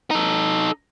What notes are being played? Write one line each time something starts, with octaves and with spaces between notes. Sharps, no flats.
D#4 A4